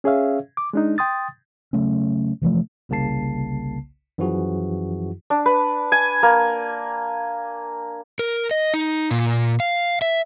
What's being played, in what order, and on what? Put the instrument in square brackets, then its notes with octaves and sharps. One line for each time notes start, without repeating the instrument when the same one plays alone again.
[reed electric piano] C#4 G#4 C#5 E5 F5
D6
G#3 D4 D#4
G5 C6 D#6 A6
[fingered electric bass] C#3 F#3 A3 C#4
C3 E3 F3 A3
[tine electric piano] G1 C2 C#3 A#3 A5 C7
F#2 E3 F3 E4 F#4 G#4
[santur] D4
B4
G#5
A#3
[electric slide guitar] A#4
D#5
D#4
A#2
F5
E5